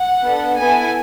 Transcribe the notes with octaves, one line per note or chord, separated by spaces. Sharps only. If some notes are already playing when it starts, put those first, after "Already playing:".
Already playing: F#5
B3 D4 A4
B3 E4 A4 G#5